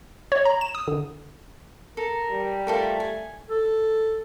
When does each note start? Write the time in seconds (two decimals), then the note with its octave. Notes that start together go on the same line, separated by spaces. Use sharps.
0.32 C#5
0.45 A#5
0.61 E7
0.75 D#6
0.88 D3
1.97 A4 A#4
2.30 G3
2.67 A3 F4 A4 A#4
3.00 G#5
3.49 A4